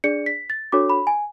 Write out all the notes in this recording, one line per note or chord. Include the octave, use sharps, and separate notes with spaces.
D4 G#4 D5 C#7
B6
A6
D4 F#4 A4 C#5 D6
B5
G#5